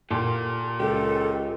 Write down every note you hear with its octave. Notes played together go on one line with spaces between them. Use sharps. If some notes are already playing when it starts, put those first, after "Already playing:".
A#2 F4 G4 A4
C#2 G4 A4